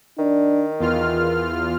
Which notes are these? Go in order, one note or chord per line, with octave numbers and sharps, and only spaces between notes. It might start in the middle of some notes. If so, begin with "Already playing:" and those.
D#3 D4
E2 F4 A#4 F6